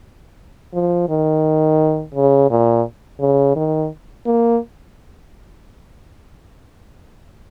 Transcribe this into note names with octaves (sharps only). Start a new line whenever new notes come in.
F3
D#3
C#3
A#2
C#3
D#3
A#3